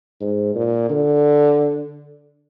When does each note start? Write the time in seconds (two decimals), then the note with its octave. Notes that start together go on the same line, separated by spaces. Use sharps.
0.21 G#2
0.55 A#2
0.90 D3